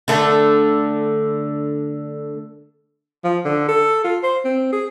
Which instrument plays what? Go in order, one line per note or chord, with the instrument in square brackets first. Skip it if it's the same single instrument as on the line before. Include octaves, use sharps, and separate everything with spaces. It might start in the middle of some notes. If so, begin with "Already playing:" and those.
[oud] D3 A3
[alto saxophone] F3
D3
A4
F4
C5
C4
G#4